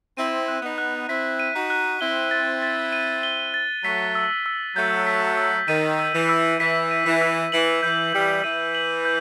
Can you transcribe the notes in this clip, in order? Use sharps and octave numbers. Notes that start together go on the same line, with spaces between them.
C4 E4 D#7
F#6
B3 D#4
F#6
C4 E4 B6
D#7
D#4 F#4
F#6
C4 E4 G7
A6
A6
D#7
G7
A6
F#3 A3 B6
E6
E6
F#3 A3 G6
B6
E6
D#3 D#7
E6
E3
E6
E3 B6
D#7
E3
E6
E3 F#7
E3 G6
E3 G3 G6
E3 D#7
F#7
G6